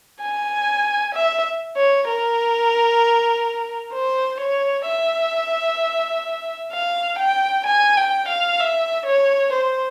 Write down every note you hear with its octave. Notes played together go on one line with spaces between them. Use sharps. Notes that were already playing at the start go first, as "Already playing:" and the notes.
G#5
E5
C#5
A#4
C5
C#5
E5
F5
G5
G#5
G5
F5
E5
C#5
C5